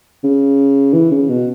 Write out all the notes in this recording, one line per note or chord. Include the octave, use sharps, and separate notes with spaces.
C#3
E3
C#3
B2